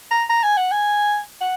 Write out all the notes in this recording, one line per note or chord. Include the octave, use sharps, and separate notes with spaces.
A#5
A#5
G#5
F#5
G#5
F#5